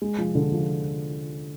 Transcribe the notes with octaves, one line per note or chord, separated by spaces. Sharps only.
G#3
F3
D3
F3